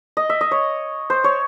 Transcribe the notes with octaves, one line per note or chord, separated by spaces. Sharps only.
D#5
E5
D#5
C#5
C5
C#5